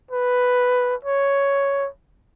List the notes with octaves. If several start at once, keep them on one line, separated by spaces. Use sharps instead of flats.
B4
C#5